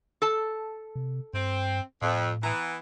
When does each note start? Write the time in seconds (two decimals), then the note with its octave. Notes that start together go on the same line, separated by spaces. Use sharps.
0.22 A4 A5
0.95 C3
1.34 G2 C4
2.02 F2 A2
2.43 E3 B3 A#5